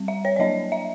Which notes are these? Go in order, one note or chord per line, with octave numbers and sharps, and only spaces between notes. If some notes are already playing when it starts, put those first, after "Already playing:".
Already playing: G3 C4
E5
C#5
D5
F#3 A#3 D4 D#5
E5